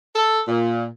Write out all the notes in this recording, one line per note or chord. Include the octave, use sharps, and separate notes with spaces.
A4
A#2